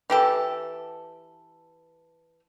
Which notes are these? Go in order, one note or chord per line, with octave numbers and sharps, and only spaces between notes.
E3 G4 A4